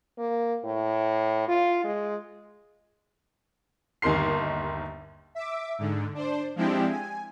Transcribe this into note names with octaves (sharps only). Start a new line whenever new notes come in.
A#3
A2
F4
G#3
G1 D#2 D#3 A#4 C6 C7
E5 D6
G#2 D3
D4 C5
F3 G#3 C4 D4 E4 G4
G#5